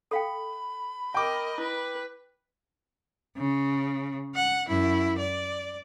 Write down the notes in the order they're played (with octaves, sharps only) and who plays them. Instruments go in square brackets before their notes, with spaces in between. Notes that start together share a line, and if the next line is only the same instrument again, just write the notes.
[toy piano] A4 F5 G5 [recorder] B5
[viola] A#4 D#5 [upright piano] G5 D6
[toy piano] E4 [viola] B4
[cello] C#3
F#5
F#2 E4
D5